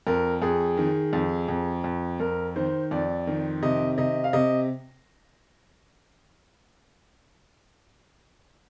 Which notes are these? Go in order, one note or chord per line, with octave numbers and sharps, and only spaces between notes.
F2 A#4
F2 G#4
D#3
F2
F2
F2
F2 A#4
D#3 C5
F2 D5
D#3
C3 D#5
C3 D#5
F5
C3 D#5